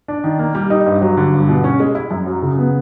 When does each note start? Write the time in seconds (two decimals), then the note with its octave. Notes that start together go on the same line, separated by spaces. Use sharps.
0.08 D4
0.24 D#3
0.39 A#3
0.55 G3
0.70 D#4
0.86 G2
1.02 F#3
1.17 D3
1.33 G2
1.49 B2
1.64 C#4
1.80 G#3
1.95 E4
2.11 F#2
2.26 F#3
2.42 C#3
2.58 B3